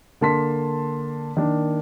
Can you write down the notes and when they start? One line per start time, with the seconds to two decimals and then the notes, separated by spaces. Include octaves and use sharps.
0.21 D3 A#3 A5 C6 B6
1.37 D#3 A#3 D4